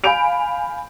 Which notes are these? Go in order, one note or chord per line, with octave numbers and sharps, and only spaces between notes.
F5 G#5 B5 G6 D7 F7